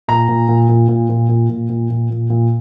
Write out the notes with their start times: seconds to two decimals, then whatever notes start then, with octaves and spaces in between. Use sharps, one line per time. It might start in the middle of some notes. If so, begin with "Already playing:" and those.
0.08 A#2 A#5
0.29 A#2
0.48 A#2
0.69 A#2
0.89 A#2
1.09 A#2
1.29 A#2
1.49 A#2
1.70 A#2
1.90 A#2
2.10 A#2
2.30 A#2